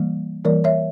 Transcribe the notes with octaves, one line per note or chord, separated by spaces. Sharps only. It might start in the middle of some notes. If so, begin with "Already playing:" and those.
Already playing: E3 G3 A#3
E3 G3 A#3 A#4 D5
C#5 E5